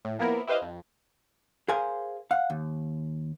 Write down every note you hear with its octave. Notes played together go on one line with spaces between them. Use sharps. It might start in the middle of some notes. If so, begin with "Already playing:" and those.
A2
F3 A#3 B3 E4 A#4
E4 G4 B4 C5 D#5 F5
F2
G#4 A#4 C5 F5 G#5
F5 F#5
D#2